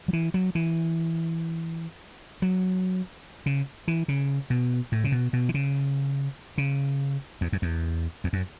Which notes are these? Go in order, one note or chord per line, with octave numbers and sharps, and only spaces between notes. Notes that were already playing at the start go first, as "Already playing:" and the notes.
F#3
E3
F#3
E3
F#3
C#3
E3
C#3
B2
A2
C#3
B2
B2
E3
C#3
C#3
E2
F#2
E2
E2
F#2